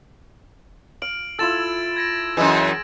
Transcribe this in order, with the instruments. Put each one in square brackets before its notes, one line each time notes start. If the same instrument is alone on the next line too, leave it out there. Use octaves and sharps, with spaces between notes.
[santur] F5 [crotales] D7 F#7
[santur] E4 F4 A4 [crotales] E6 A6 E7
[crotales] G#6 A#6 D7
[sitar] F#2 E3 [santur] G#3 D#5 E6